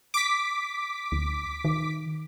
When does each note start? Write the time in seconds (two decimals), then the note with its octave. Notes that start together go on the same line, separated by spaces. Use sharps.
0.14 D6 B6
1.12 D2
1.65 D#3